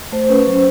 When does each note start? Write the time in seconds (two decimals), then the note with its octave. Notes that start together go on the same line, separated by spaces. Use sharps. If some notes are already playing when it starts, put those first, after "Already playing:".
0.12 A3 C5
0.29 C#4 B4
0.47 F#3 C5